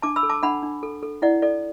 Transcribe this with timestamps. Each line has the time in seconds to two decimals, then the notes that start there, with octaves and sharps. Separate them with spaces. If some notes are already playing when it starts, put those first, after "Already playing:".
0.02 D4 A5 D6
0.16 B5 E6
0.23 A4
0.29 A5 D6
0.43 D4 F#5 B5
0.62 D4
0.83 A4
1.03 A4
1.22 E4 D5 F#5
1.42 A4 D5